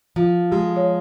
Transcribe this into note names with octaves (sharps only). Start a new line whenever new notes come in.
F3 F4
G#3 G4
C#5